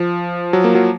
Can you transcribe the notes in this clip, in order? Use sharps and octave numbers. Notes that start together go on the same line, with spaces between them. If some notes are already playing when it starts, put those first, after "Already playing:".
Already playing: F3
F#3
A#3
F#3